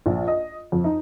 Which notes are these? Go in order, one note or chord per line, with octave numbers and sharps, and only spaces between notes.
A#1
D#5
F2
D#4